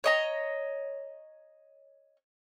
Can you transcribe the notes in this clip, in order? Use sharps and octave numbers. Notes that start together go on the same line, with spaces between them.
C#5 D#5 A#5